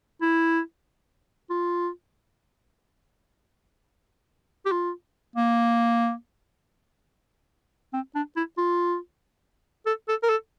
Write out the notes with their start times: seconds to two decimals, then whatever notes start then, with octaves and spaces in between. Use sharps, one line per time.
0.21 E4
1.50 F4
4.66 G4
4.71 F4
5.36 A#3
7.93 C4
8.15 D4
8.36 E4
8.58 F4
9.86 A4
10.08 A4
10.23 A#4
10.30 A4